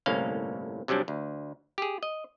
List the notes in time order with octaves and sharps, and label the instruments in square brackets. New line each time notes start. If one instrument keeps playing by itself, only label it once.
[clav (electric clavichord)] G1 C2 A2 A#3 C#4 F5
C3 F#3 G3 C#4 D4
D2
G4 G#4
D#5